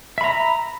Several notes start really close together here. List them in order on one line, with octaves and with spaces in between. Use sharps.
E5 B5 A#5